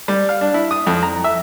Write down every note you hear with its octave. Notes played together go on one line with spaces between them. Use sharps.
G3
F5
D4
E4
D#6
F2
A#5
E5